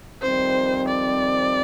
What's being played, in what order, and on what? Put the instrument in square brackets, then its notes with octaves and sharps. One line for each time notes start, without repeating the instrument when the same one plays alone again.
[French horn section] F2 D#3 G3 C4 [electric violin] C5
[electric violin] D5